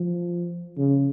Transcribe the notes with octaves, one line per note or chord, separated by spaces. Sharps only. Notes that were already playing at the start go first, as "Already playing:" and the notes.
Already playing: F3
C#3